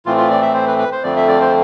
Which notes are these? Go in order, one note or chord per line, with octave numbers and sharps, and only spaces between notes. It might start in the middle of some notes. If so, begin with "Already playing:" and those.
A2 E3 A3 C4 F4
F4
D5
E5
C5
B4
B4
C5
F2 D3 F3 A3 C4 D5
E5
D5
C5